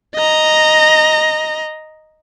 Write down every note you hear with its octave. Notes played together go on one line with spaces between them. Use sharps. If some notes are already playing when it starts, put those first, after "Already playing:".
D#5 A#5